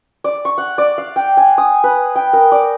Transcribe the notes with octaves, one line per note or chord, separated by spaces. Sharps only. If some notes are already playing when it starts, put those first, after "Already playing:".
D5
C#6
F#5
D5
F5
G5
G#5
D#6
B4
G5
A#4
D5